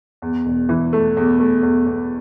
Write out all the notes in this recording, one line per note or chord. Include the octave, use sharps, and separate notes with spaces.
E2
E1
E3
A3
E2
A3
E2
E2